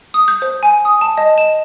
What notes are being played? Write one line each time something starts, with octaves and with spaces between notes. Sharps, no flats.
D#6
G6
C5
G#5
D#6
A5
D#5
E7